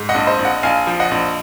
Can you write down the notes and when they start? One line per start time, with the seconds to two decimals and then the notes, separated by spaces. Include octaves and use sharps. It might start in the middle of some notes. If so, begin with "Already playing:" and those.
Already playing: G#2
0.09 D#5 F#5
0.14 A#1
0.27 C5 D#5
0.39 A#1
0.45 D#5 F#5
0.63 A#1 F5 G#5
0.87 F3
1.00 D#5 F#5
1.11 A#1